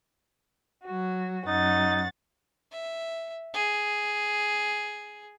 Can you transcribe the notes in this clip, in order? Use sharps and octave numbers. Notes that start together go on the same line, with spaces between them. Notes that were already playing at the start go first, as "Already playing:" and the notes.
F#3 F#4
F#2 D#4 F#5 A6
E5
G#4